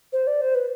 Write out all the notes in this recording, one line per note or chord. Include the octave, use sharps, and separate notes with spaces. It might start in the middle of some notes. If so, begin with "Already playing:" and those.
C5
D5
C5
B4